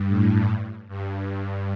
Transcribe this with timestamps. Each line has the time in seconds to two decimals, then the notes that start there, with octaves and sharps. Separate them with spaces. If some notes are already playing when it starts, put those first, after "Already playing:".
Already playing: G2
0.08 A2
0.88 G2